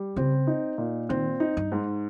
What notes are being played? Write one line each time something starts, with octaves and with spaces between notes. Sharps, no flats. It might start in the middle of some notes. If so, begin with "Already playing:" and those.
Already playing: G3
C#3 C4
D#4
A#2
D#3 C4
D#4
G2
G#2